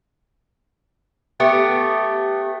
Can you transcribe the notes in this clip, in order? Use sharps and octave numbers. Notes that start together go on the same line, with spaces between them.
A3 B3 G4